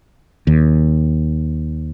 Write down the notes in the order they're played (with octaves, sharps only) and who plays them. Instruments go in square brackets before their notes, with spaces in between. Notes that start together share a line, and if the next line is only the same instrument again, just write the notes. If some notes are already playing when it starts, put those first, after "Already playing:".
[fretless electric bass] D#2